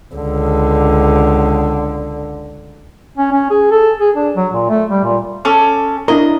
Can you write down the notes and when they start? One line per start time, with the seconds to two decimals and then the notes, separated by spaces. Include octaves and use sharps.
0.14 C#2 D3
3.18 C#4
3.32 C#4
3.50 G#4
3.71 A4
4.01 G#4
4.15 D4
4.36 F#3
4.53 A#2
4.70 A3
4.90 G3
5.04 A#2
5.45 C#4 A4 D6
6.08 D4 E4 A#4 D#5